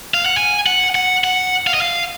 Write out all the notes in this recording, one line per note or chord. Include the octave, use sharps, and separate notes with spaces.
F5
F#5
G#5
F#5
F#5
F#5
F5
D#5
F5